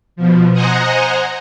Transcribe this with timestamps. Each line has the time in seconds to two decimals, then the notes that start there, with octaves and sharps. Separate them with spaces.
0.16 B2 F3
0.53 C5 D#5 F#5 G#5 A#5